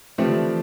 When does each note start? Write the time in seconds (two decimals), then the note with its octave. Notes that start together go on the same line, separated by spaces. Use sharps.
0.18 E3 F3 A3 C4 G4
0.26 D3
0.32 E3